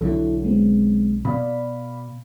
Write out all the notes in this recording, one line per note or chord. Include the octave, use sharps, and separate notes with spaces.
B1 D3 F#3 E4 A4
G#3 B3 C4
B2 B3 D5 F5 B5